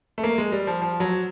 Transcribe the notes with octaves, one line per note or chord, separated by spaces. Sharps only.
A3
A#3
G#3
G3
F3
F3
F#3